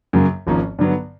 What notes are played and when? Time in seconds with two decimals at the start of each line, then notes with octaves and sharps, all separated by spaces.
0.13 F#2 C#3 F#3 A#3
0.47 G#1 G#2 F3 A#3 C#4
0.79 G2 D3 F#3 B3